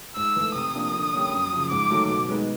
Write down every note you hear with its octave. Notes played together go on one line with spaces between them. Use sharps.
G#2 E6
E3 A3
C3 D#6
F3 A#3 D4
D3
G3 A#3 C#4
F#2
C#3 F3
G#2 D6
D#3 F#3 A3
B2
G#3 B3 D#4